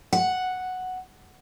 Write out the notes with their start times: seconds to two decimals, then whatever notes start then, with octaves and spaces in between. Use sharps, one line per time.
0.13 F#5